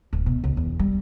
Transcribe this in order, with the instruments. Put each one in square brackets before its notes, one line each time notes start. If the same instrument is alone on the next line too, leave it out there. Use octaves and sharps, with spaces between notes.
[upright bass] D1
B2
C#2
E2
G3